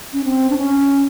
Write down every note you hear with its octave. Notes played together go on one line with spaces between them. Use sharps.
C#4
C4
D4
C#4